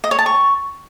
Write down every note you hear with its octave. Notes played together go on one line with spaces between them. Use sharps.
D#5
C#5
A5
C#6